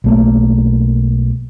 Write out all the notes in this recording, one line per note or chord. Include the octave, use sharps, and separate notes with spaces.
B1 A3 A#3